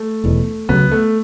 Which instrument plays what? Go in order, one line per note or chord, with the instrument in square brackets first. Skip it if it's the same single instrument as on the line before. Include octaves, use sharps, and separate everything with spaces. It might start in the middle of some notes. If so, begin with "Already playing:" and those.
Already playing: [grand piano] A3
[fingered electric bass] E1 E2 B2
[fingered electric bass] C#2 C#3 F#3 [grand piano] B3
[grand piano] A3